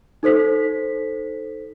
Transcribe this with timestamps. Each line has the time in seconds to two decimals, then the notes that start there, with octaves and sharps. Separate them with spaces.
0.23 D#4 A4 C5 B6